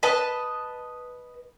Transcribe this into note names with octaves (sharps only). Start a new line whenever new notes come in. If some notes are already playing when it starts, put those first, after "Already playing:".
B4 D#5 A5